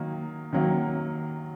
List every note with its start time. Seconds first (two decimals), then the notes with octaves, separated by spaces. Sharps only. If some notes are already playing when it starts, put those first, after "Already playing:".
Already playing: D#3 F#3 A#3
0.53 D#3 F#3 A#3